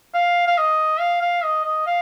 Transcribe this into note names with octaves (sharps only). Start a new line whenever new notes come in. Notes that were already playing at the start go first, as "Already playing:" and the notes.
F5
F5
D#5
F5
F5
D#5
D#5
F5